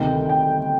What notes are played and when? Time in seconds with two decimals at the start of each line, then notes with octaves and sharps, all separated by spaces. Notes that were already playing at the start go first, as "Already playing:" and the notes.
Already playing: D2 C3 D#3 G5
0.29 G5